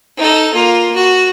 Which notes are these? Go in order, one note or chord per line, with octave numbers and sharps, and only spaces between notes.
D#4 A4
A#3 F4
F#4